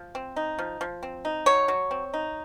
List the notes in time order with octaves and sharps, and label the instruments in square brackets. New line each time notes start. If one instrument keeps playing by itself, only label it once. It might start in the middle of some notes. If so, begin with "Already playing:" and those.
Already playing: [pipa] F3
C4
D#4
F3
F3
C4
D#4
F#3 C#5
F#3
C4
D#4